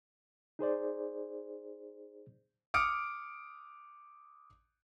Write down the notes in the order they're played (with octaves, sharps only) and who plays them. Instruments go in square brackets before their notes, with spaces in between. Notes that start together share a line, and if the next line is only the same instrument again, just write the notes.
[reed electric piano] D#4 G#4 C5 D5
[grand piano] D6 D#6 F6 C#7 D7